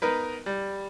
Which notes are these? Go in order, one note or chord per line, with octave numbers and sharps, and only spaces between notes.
B3 D#4 A#4 B4
G3